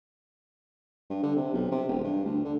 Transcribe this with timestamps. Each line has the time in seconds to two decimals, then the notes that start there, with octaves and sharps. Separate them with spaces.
1.10 G2
1.23 D3
1.36 C3
1.54 B1
1.71 C3
1.88 E1
2.03 G2
2.25 D2
2.44 D3